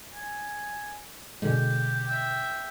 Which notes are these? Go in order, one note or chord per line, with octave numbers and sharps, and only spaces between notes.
G#5
B2 D3 G#3 G4
E5 G5